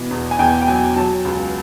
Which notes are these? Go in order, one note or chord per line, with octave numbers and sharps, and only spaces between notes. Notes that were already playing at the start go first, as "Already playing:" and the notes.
Already playing: B2 E3
E2
G#5
E2 G5
G5
F#3 G#5
F#3 A5
C#2